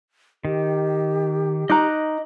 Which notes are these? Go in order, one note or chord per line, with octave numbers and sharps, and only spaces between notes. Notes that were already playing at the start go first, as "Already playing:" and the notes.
D#3 G4
D#4 D#5 A#5 D6 F#6